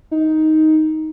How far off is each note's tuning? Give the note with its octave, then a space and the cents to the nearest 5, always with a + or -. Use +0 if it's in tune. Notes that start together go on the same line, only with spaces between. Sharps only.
D#4 +10